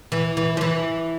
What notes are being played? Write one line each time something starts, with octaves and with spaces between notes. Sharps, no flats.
E3
E3
F3
E3